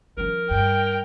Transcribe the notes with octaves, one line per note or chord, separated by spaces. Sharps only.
F3 C#4 A#4
G2 G5